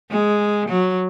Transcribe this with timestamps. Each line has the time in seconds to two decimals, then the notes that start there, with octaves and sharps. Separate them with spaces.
0.11 G#3
0.69 F#3